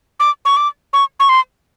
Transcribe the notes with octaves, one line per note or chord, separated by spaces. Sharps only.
D6
C#6
D6
C#6
C#6
C6